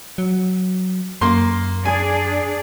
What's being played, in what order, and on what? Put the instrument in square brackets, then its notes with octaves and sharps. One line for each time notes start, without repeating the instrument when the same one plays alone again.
[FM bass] F#3
[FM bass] F#2 [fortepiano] A#3 C6
[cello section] D4 G#4 D5 [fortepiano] G#5